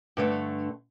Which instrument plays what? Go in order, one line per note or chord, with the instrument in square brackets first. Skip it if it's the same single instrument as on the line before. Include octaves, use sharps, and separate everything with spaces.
[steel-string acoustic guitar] G2 D3 A3